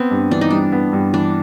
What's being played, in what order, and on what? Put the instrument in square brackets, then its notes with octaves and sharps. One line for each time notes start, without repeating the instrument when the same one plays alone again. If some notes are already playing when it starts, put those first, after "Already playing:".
Already playing: [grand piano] B3 [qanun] C4
[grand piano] G2
[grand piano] E3 [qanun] D4
[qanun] D#4
[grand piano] G3 [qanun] D4
[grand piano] B3
G2
[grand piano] E3 [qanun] D4